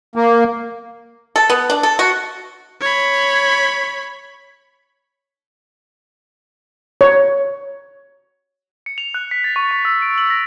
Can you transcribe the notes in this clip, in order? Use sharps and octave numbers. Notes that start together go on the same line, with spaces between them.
A#3
A4
B3
D4
A4
F#4
C#5 B5
C#5
C#7
F7
F#6
B6
A6
C#6
C#6
E6
D7
F#7
A#6